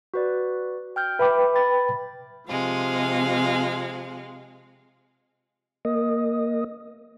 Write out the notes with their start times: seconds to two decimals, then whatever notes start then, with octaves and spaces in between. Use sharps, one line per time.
0.14 F#4 B4 D5
0.96 G5 F6 G6
1.19 B4 E5 G5 B5 D6
1.56 B5 A6
2.49 C3 F3 G#3 F5
5.85 A#3 D#5